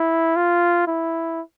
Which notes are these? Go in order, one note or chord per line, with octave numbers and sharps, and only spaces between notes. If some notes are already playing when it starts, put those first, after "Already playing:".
Already playing: E4
F4
E4